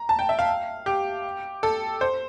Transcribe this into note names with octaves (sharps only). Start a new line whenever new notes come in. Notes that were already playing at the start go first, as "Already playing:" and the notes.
Already playing: A#5
A5
G5
E5
F5
G4
A4
C5